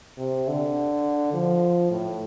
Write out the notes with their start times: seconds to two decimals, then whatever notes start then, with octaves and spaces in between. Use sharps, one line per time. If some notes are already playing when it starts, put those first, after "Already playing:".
0.19 C3
0.48 D3
1.34 F3
1.91 A2